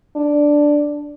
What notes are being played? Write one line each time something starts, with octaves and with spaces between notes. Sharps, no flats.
D4